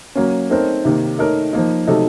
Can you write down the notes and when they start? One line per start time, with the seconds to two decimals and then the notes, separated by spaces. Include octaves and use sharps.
0.15 F#3 A#3 C#4
0.50 A3 C4 D#4 A#4 C#5
0.85 C3 D#3 A#3
1.18 A3 D#4 A#4 C#5
1.53 F3 A#3 D#4
1.87 C3 F#3 A3 D#4 A4